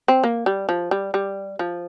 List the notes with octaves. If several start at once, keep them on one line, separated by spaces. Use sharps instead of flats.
C4
A#3
G3
F3
G3
G3
F3